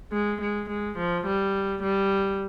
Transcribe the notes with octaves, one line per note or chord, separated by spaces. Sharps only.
G#3
G#3
G#3
F3
G3
G3